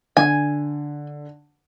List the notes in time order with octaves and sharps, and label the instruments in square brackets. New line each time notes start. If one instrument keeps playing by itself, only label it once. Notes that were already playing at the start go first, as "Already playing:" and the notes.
[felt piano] D3 [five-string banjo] G#5